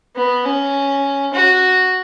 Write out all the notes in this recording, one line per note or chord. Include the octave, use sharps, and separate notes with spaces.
B3
C#4
F#4